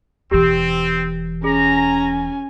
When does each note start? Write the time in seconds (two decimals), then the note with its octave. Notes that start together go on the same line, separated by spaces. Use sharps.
0.31 E1 E3 C4 G4
1.44 C#4 G#4 G#5 A#5